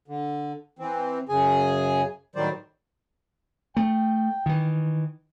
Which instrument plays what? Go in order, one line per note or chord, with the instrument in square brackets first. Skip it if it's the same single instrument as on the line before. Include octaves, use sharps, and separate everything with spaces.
[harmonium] D3
E3 C4
F#2 C#3 G#4 G#5
A2 D#3 F#3 G3 C5 D5
[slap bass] A3 [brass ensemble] G5
[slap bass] D#3 E3